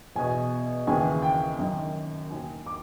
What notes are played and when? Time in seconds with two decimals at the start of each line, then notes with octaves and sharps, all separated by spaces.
0.16 E2 B2 G#5
0.87 D#2 C#3 E3 G#5
1.22 G5
1.59 F#2 D#3
2.30 D#2 D#3 G#5
2.66 D6